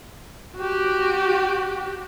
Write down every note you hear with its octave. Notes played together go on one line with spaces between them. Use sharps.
F#4 G4